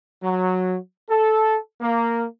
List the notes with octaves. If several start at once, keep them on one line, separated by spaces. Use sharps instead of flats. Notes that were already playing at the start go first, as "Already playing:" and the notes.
F#3
A4
A#3